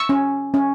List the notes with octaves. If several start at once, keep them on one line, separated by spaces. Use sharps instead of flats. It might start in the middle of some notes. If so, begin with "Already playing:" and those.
Already playing: C#6 E6
C#4
C#4